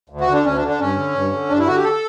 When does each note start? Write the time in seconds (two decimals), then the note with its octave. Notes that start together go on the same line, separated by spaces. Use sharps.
0.10 D2
0.21 F#4
0.27 D3
0.33 D4
0.44 D2 C#4
0.56 D4
0.62 D3
0.68 D4
0.80 G2 C#4
0.96 D3
1.14 G2
1.32 D3
1.49 G2 D4
1.59 E4
1.67 D3 F#4
1.76 G4
1.84 A4